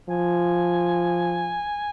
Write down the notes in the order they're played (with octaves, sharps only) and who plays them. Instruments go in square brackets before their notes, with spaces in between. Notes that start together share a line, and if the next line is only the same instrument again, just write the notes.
[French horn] F3 [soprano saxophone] G#5